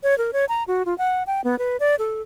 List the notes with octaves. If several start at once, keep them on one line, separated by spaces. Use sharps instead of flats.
C#5
A#4
C#5
A#5
F#4
F4
F#5
G5
B3
B4
D5
A4